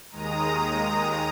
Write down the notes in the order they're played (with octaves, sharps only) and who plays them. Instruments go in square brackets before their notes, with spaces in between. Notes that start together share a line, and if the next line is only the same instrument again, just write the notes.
[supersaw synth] D#2 D#3 G#3 A#5 D#6